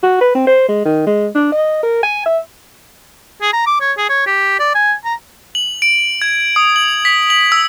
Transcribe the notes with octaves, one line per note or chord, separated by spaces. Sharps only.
F#4
B4
C4
C5
G#3
D#3
G#3
D4
D#5
A#4
G#5
E5
G#4
A#5
D6
C#5
G#4
C#5
G4
D5
G#5
A#5
F#7
D7
G#6
D#6
F#7
B6
F#7
E6